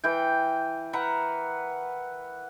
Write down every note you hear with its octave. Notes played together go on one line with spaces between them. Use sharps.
E3 G5
A#4 B4 E5 F#5